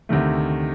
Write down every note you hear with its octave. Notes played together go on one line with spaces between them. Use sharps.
D2 C3 D#3 A3